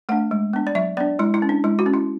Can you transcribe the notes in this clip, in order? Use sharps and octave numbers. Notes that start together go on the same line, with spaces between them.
A3 D4 F#5
G#3
B3 D4
D5
F#3 E5
B3 D4 D5
G#3 E4
E4
C#4
D4
G#3 E4
F#4
C#4
E4